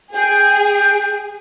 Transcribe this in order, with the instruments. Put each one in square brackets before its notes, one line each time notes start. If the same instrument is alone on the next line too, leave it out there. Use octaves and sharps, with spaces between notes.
[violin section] G#4 [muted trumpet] G5